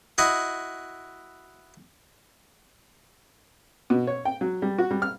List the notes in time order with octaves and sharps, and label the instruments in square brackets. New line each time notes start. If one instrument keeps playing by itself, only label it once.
[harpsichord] E4 F#4 D#5
[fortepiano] B2
C#5
G5
F#3
G3
F#4
G3
F6